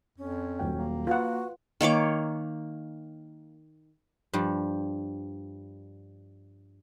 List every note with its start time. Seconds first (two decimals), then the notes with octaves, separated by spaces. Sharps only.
0.18 F2 C#4
0.59 D#1 F#3 G5
0.77 A#3
1.07 F4 F#4 B4 F#5
1.81 D#3 A#3 C#5 D6
4.33 G2 F3 G3